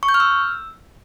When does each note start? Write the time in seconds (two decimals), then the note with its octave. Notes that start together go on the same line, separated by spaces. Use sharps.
0.03 C#6
0.09 G6
0.14 F6
0.20 E6